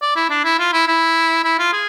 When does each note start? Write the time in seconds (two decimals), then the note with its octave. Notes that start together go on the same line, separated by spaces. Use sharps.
0.02 D5
0.16 E4
0.30 D4
0.44 E4
0.59 F4
0.73 E4
0.88 E4
1.44 E4
1.59 F4
1.73 G#4